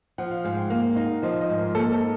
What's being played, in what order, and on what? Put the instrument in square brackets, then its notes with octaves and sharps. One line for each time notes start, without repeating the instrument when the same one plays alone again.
[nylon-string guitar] F3 [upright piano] F#5
[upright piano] F5
[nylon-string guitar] G#2 [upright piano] F5
[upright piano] G5
[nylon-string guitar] A#3 [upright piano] F5
[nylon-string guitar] D#4
[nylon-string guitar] F3 [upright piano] D#5
[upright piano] D#5
[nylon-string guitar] G#2
[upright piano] A#4
[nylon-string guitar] A#3 [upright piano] A4
[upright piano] A4
[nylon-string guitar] D#4